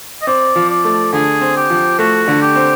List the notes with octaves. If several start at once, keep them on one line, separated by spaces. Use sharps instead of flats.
D#5
C4 D5
F3
D5
A3
D3 G#4
C4
G4
F3
A3 F#4
D3
G4
C4